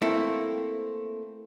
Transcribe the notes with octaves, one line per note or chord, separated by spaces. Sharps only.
A3 A#3 C4 E4